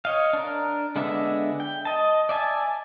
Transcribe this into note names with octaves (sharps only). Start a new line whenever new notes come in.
C#5 D#5 F5
D4 A#4
D3 G#3 B3 D4 E5
G5
D#5 A5
D5 E5 G#5 A5